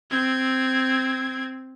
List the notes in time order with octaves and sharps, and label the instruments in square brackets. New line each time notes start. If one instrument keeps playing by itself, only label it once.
[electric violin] C4 G#6